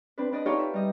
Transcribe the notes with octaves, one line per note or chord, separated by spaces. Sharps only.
C4 D4 B4
D4 B4 D5 D#5
D#4 F4 G4 A4 C#5 D5
E5
G3 D#5